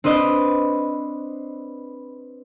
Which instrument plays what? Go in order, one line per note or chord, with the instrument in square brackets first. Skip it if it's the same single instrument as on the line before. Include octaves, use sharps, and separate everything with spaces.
[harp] C4 D4 B4 D#5